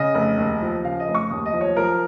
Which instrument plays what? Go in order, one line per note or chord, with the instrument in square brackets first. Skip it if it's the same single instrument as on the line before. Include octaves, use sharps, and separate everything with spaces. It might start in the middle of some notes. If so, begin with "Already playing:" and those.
Already playing: [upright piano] C#3 D#5
F1
D#2
F3
C#3 F5
D#5
F1
C#6
D#2 D#6
D#5
F3
C#5
F3 A#4